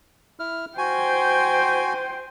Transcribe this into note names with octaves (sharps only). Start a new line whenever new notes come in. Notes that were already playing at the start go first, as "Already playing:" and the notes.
E4 F6
F#4 C5 G5 G#5